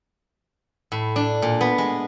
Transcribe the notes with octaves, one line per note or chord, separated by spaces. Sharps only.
A2
D4
A#2
B3
G#3